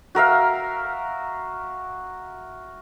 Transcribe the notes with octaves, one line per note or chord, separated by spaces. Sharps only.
F#4 A#4 E5 F5